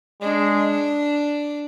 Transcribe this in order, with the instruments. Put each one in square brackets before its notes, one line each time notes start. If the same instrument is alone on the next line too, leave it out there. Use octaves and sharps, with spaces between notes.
[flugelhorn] G#3 [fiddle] D4